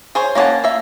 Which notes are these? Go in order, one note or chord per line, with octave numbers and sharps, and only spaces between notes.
G#4 C5 C#5
A#3 C#4 D5 F#5 A5
A#3 E5